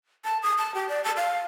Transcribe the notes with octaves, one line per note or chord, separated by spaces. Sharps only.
A5
D#6
A5
G4
D5
A5
F5